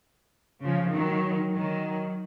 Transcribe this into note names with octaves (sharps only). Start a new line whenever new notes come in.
C#3 F3
D#3 F#3
D#3 F#3